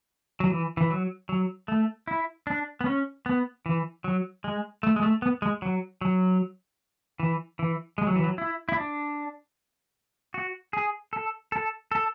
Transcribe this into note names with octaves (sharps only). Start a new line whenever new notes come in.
F#3
E3
E3
F#3
F#3
A3
E4
D4
B3
C#4
B3
E3
F#3
G#3
A3
G#3
A3
B3
G#3
F#3
F#3
E3
E3
G#3
F#3
E3
F#3
E4
E4
D4
F#4
G#4
A4
A4
A4